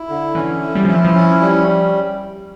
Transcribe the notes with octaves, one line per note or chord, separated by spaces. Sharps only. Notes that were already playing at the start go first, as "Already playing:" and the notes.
Already playing: E4
D3
E3 C#4
E4
G3
F3 E4
E3
F3
C#4
G3